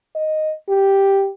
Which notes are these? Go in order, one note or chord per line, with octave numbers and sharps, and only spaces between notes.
D#5
G4